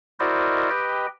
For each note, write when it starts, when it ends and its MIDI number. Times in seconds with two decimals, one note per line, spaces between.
0.20 0.70 64
0.20 0.70 66
0.20 0.70 70
0.20 0.70 72
0.20 0.70 74
0.20 0.70 75
0.70 1.07 67
0.70 1.07 71
0.70 1.07 75
0.70 1.07 79